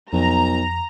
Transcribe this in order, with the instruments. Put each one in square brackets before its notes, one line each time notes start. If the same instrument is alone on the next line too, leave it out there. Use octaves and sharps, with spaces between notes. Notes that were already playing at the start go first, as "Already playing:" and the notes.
[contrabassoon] B1 [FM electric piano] F2 [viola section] A#5